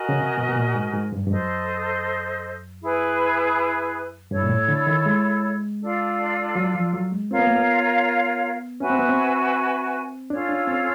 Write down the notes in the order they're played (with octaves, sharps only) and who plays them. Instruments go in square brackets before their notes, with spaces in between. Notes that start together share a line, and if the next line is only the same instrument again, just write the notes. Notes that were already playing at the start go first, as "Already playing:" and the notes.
Already playing: [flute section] F#4 A#4 D#5 G#5
[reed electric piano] C#3
C3
B2
B2
A#2
G#2
G#2
G2
G2
[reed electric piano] F#2 [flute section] A4 C5 D#5
[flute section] E4 G#4 B4
[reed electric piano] G2 [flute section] E4 A4 C#5
[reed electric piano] A#2
A2
D3
D#3
G#3
[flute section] D4 F4 A4
[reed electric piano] F#3
F3
F#3
G#3
[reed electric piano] C4 [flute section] F4 A#4 C#5 F5
[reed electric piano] B3
A#3
B3
[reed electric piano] C#4 [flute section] F#4 B4 E5 G#5
[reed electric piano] C4
B3
C4
[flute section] C#4 F4 A4 C#5 [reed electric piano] D4
[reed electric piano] D4
C4